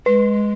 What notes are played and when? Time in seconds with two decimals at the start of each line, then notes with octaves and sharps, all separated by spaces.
0.06 G#3 B4